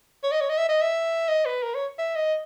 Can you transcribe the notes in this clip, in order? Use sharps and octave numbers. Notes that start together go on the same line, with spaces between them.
C#5
D#5
C#5
D#5
E5
D#5
E5
D#5
B4
A#4
C#5
E5
D#5